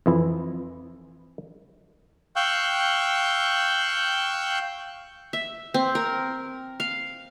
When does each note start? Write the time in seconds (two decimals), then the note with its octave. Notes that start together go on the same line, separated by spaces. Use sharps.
0.06 F2 E3 E4
2.36 F5 G5 C#6 E6 F#6 G6
5.33 E5
5.74 C4
5.95 A#4
6.80 F5